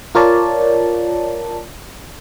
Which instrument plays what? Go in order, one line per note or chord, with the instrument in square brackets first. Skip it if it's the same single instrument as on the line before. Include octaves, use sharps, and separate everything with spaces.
[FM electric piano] F4 A#4 C#5 D5 A5